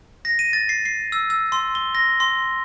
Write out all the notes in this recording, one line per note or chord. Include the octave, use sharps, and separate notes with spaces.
A#6
D#7
A6
C7
C7
E6
E6
C6
G7
A#6
C6